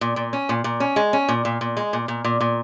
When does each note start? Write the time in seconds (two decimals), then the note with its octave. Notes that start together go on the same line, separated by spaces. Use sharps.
0.01 A#2
0.16 A#2
0.33 C#4
0.49 A#2
0.64 A#2
0.80 C#4
0.96 G#3
1.13 C#4
1.29 A#2
1.45 A#2
1.61 A#2
1.77 G#3
1.93 A#2
2.08 A#2
2.25 A#2
2.41 A#2